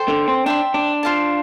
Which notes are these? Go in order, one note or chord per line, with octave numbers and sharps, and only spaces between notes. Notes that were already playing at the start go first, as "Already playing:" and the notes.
Already playing: A4 C5 G5
D3
C4
D4 C5 E5 G5
D4
F4 C5 F5 A5